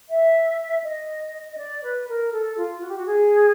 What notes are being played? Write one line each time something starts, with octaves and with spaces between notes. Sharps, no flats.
E5
D#5
D#5
D5
B4
A#4
A4
F4
F#4
G4
F#4
G#4